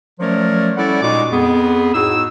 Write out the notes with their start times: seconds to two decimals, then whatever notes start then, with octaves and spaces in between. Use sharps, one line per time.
0.20 F3 F#3 A3 C#4 A#4 D5
0.77 G3 C#4 E4 A4 D5 F#5
1.02 A#2 G#3 D#4 F#4 D6
1.31 F2 B3 G#4
1.93 A2 D#4 F#4 G#4 E6